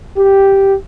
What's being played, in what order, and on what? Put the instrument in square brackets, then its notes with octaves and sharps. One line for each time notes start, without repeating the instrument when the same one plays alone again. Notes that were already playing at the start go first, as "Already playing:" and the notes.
[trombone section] G4